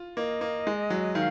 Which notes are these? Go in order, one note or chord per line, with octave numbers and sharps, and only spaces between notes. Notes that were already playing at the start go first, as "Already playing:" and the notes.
Already playing: F4
A#3 D#5
A#3
G#3
F#3
D#3 F5